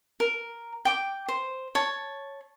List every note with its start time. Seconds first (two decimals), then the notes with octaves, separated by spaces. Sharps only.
0.20 A#4
0.85 G5 D6
1.28 C5
1.75 C#5 A5